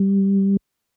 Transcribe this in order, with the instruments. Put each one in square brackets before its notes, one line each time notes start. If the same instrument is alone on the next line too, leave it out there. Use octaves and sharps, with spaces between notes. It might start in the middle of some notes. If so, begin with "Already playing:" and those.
Already playing: [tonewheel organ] G3